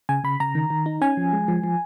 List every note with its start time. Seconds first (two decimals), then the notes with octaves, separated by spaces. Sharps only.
0.09 C#3 G#5
0.24 C#3 B5
0.40 C#3 A#5
0.55 D#3
0.70 D#3
0.86 D#4
1.01 C#4 G#5
1.17 F3
1.33 G#3
1.48 F3
1.64 F3